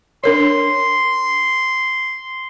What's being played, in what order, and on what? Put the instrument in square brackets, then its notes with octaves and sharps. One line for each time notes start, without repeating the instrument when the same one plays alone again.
[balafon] D4 A#4 C#5 [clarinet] C6